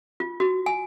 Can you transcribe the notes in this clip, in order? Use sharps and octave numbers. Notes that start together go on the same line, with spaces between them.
F4
F#4
G#5